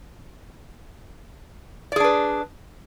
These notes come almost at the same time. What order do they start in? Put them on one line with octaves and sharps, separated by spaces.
D5 G#4 D4 B4